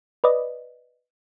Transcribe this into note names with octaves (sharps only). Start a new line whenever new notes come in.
B4 D5 D#5